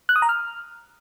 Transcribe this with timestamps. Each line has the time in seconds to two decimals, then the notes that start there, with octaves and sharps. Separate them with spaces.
0.09 F#6
0.16 D#6
0.22 A#5
0.29 F6